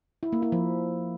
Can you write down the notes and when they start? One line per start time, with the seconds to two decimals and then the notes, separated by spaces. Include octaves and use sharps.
0.23 E4
0.33 A#3
0.42 E4
0.52 F3